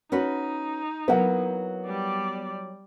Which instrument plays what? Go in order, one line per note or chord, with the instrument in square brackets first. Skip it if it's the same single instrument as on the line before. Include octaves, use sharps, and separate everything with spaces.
[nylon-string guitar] C#4 F#4 B4 [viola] D#4
[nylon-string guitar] F#3 A#3 E4 [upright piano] B3 F#5
[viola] G3 D5